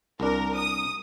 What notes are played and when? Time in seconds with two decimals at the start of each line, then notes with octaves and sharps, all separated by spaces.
0.20 C2 D4 A#4
0.56 D#6